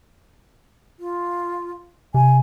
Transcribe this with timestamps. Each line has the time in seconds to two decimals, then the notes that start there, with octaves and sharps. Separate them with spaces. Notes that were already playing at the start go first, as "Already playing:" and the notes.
0.99 F4
2.14 C3 G#5